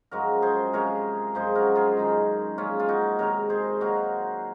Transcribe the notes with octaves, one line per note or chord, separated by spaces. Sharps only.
F#2 F3 G#3 F#4 A#4
G#4 C5
C3 F3 G#3 A#4 C#5
F#2 F3 G#3 G#4 C5
F#4 A#4
F4 G#4
F#2 D#3 G#3
A#2 F3 G#3 C#4 F4
F4
D#4 F#4
C3 D#3 G#3 A#4 C#5
G#4 C5
A#2 F#3 F#4 A#4